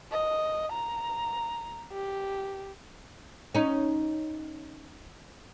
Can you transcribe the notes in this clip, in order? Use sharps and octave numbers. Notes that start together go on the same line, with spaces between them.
D#5
A#5
G4
C#4 D#4